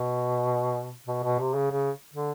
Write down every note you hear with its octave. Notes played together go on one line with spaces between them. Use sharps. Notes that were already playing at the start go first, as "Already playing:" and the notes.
Already playing: B2
B2
B2
C3
C#3
C#3
D3